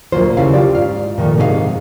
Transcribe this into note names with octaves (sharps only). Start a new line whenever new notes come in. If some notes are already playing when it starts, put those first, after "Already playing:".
D2 A#2 F#3 A#3 F4 C5
D#2 C#3 G3 C#4 E4 F5
F4 G4 D5
G#2 F5
A#2 D#3 F3 A3
G#2 C3 D#4 G4 G#4 F5